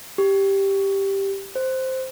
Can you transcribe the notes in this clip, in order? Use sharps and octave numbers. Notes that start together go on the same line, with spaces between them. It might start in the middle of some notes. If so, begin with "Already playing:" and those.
G4
C5